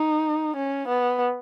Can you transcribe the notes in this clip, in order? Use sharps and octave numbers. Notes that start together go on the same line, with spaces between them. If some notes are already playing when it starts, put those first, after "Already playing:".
Already playing: D#4
C#4
B3